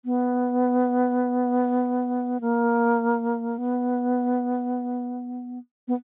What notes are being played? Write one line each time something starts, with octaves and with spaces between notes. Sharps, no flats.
B3
A#3
B3
B3